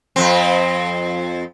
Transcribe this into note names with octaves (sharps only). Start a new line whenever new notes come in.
F2 C4